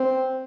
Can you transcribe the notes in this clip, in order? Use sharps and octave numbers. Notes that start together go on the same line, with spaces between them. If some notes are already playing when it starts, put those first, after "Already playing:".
Already playing: C4